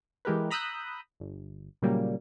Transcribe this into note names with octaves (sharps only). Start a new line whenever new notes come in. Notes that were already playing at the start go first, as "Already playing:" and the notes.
E3 G#3 G4 A#4 B4
A#5 B5 D#6 E6 F#6 G6
G1
A#2 C#3 F#3 G3 A#3